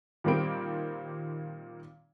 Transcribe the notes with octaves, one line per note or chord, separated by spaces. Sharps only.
A#2 D#3 G3 A#3 C4 D7